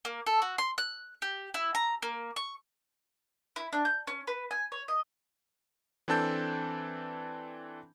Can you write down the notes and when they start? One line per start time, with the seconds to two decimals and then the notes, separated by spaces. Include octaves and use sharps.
0.05 A#3
0.26 A4
0.42 F#4
0.58 C6
0.78 F#6
1.22 G4
1.54 E4
1.75 A#5
2.02 A#3
2.36 C#6
3.56 E4
3.73 D4
3.85 G6
4.07 C#4
4.27 B4
4.51 G#5
4.72 C#5
4.88 D#5
6.08 E3 C4 D4 A4 A5 G6